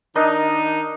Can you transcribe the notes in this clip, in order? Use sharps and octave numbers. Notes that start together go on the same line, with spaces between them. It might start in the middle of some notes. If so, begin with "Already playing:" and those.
D#3 D4 D#4 A#4 D#5